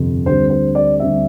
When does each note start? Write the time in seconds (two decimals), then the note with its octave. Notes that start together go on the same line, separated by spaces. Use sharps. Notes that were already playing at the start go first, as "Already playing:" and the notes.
Already playing: G1 F2 C3
0.26 D2 D3 G3 C4 C5
0.50 C5
0.75 D5
1.00 D2 D3 G3 C4 E5